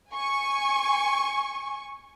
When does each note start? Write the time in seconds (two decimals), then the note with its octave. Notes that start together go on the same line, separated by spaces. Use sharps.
0.12 G#5 C#6